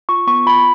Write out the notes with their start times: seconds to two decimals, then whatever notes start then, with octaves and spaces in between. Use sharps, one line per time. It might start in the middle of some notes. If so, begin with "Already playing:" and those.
0.09 F4 C#6
0.27 B3 C#6
0.46 F4 B5